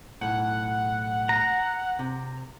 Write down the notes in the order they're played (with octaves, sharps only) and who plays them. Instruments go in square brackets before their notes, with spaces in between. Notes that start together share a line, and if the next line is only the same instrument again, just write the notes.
[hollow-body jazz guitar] B1 A2 [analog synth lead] F#5
[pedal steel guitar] A#5
[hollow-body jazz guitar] C3